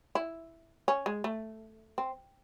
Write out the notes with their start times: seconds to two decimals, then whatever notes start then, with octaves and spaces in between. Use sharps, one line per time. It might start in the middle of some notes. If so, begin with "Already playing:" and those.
0.15 E4
0.88 C#4
1.06 G#3
1.24 A3
1.98 C4